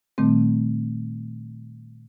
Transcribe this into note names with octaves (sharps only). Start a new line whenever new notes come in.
A#2 D#3 G3 A3 C4